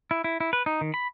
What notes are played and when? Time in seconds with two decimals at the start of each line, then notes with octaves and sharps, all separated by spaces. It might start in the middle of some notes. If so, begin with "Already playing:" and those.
0.11 E4
0.24 E4
0.40 E4
0.53 B4
0.66 D#4
0.81 D#3
0.94 B5